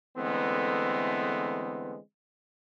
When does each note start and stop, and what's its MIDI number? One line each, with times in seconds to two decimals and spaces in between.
0.17 1.98 50
0.17 1.98 52
0.17 1.98 56
0.17 1.98 57
0.17 1.98 59
0.17 1.98 60